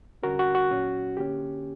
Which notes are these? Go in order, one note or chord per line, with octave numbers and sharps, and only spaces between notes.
E2 D3 G3 C#4 F#4 A#4
F#4
F#4
A#2 F#3 C#4
D3 A#3 C#4 G4